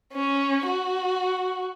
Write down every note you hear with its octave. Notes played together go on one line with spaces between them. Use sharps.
C#4
F#4